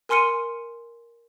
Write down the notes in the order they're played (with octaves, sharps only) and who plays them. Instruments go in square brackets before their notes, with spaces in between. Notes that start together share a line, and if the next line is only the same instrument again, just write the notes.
[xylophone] A#4 G#5 C6 F6 C#7 D#7